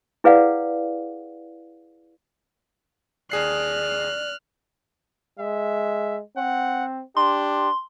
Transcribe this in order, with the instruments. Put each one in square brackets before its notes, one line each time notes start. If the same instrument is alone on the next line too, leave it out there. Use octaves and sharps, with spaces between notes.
[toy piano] E4 G#4 B4 D5 F5 F#5
[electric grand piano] D#2 G#4 C7 [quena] D5 [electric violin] F6 F#6
[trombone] G#3 [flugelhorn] E5
[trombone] C4 [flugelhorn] F#5
[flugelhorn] D4 [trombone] G4 [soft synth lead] C6